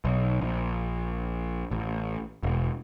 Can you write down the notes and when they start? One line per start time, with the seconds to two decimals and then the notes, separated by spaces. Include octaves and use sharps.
0.05 B1
0.41 A#1
1.71 A1
2.43 E1